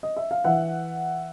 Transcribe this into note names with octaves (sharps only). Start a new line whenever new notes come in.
D#5
E5
F5
E3 E5 F#5